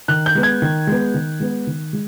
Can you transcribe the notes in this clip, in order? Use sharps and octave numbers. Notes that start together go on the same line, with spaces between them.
D#3 F#6
G6
G#3 B3
G#6
D#3
G#3 B3
D#3
G#3 B3
D#3
G#3